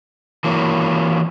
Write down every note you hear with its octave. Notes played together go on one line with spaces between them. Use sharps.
E3 F#3 A#3